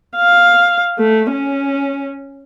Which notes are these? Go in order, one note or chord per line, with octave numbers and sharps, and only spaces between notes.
F5
A3
C#4